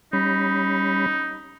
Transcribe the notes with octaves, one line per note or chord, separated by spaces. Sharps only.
G3 C#4 D#4 B5